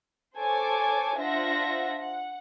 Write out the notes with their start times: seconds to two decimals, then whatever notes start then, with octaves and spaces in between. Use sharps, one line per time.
0.36 A4 C5 C#5 G#5 A5 D6
1.17 D4 F4 C5 E5 F#5 A#6
1.99 F#5